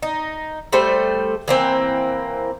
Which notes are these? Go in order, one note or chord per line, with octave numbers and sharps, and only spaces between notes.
D#4
G3 A3 A4 C5
E3 A#3 C4